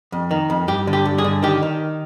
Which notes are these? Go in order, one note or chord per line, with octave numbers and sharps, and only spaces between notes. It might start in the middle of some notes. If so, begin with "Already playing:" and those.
F2
D#3
F2
G2 G4
D3
G4
G2
G#4
D3
D#3 G4
D#3